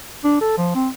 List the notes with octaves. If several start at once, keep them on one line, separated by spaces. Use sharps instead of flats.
D4
A4
F3
C4